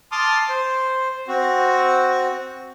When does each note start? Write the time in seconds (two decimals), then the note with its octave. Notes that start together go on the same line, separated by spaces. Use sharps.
0.12 A5 C6 D6 D#6 F6
0.49 C5
1.28 C4 F#4